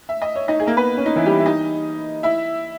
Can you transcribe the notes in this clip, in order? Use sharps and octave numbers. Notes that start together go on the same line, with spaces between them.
E5
D#5
C#5
D#4 D#5
G#4
A#3 A#4
B3 B4
C#4
D#4
E3 E4
G3 G4
E5
D#4 D#5
E4 E5